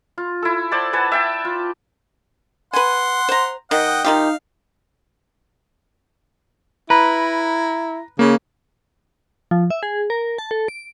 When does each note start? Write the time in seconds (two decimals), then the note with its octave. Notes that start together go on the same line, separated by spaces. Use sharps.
0.18 F4
0.42 E4 A4
0.71 C5 D5 F#5 A5
0.93 B4 F#5 G#5 A5
1.12 E5 G5 A5
1.45 F4
2.73 B4 F#5 G#5 C6
3.29 C5 A#5
3.71 D#3 D#5 F#5 G5
4.05 D#3 D#4 F4 G4 F5
6.90 E4 B4 A#5
8.19 C#3 A#3
9.51 F3
9.70 E5
9.83 G#4
10.10 A#4
10.38 A5
10.51 A4
10.68 D7